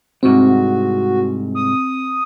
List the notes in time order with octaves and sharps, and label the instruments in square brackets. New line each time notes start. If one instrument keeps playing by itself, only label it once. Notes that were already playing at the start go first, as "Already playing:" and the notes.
[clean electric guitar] C2 G#2 [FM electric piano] C4 [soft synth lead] F#4
[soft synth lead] D#6